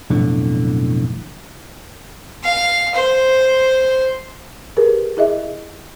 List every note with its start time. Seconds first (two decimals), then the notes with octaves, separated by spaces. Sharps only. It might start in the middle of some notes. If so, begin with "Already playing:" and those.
0.10 B1 F2 A2 D3
2.44 F5
2.95 C5
4.77 G4 G#4 A#4 B4
5.17 E4 G#4 D#5 E5